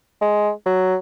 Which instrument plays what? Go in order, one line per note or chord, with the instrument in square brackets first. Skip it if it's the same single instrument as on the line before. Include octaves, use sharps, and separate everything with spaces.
[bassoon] G#3
F#3